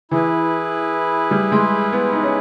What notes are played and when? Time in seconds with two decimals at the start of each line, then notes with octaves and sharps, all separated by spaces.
0.11 E3 E4 G#4 B4
1.31 G3
1.52 G#3
1.93 B3
2.13 D#4
2.24 C#4